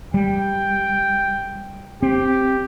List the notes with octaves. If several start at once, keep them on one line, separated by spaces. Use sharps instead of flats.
G3 G5
C4 G4